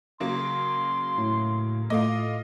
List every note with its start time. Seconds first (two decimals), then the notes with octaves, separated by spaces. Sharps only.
0.20 C#3 F#3 A#3 C6
1.18 A2
1.90 A2 A3 F4 D#5 D6